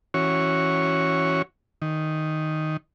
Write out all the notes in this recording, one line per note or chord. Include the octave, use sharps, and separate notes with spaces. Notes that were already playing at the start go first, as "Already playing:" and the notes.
E3 C#4 F#4 C#5
D#3